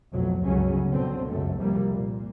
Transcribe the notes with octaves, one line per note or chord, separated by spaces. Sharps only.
B1 F2 A2 F#3
G1 C#2 C#3 F#3 C#4
B2 D3 C4
C#2 F#2 A3
C2 F2 C3 G3 A#3
A#2